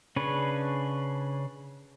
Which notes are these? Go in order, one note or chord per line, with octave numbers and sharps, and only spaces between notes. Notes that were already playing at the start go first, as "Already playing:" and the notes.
C#3 C#4 D4 B4 C#5